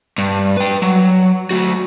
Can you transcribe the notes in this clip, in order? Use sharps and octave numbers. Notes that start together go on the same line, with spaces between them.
G2
B4 G5
F#3
A3 F#4